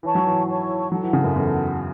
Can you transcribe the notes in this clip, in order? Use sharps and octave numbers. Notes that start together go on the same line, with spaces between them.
E3 E4 C#5 A5 C#6
F#3
E3
E4 C#5 A5 C#6
F#3 E4 A4 F#5 A5
E3
C#3
F#2
E2 E4 A4 F#5 A5